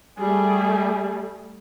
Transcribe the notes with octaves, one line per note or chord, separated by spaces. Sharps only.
G3 A3 G#4